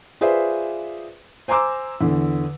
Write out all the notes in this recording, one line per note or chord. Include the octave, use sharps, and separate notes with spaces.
F4 G#4 B4 C5 D5 E5
C5 G#5 A#5 C6 D6 E6
E2 D3